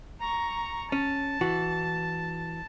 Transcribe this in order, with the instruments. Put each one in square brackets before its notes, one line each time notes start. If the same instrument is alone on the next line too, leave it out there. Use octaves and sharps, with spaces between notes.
[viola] A#5 C#6
[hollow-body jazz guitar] C#4 [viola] A5
[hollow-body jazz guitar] E3 F#4